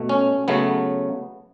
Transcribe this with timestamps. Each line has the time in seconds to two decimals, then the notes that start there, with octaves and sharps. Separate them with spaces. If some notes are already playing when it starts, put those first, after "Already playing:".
Already playing: B2 A3
0.09 C#4
0.48 C#3 F#3 A3 B3